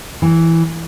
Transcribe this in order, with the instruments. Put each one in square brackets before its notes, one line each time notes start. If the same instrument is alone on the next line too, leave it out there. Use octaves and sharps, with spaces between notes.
[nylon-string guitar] E3